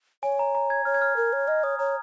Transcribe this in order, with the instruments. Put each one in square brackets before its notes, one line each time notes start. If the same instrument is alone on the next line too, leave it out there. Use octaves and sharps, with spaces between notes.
[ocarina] C#5 [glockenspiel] G#5
[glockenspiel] A#5
A#5
G#6
[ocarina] C#5 [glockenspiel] F6
[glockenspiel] G#6
F6
[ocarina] A#4
C#5
[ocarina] D#5 [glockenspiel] F6
[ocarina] C#5 [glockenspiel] D#6
[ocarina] C#5 [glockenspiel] A#5